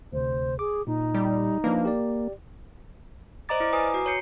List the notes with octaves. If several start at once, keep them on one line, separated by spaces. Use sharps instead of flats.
D2 C3 C5
G#4 D6
A#2 D#4
G3
F3 A#3 D4 B4
G4 D5
C5 D5 D#5 A#5 D6 A6
E4 D6
B4 G#5 A#5 D6 D#6
F#4
C#5 A#5 G6 C7 C#7